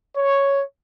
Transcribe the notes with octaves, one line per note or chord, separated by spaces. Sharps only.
C#5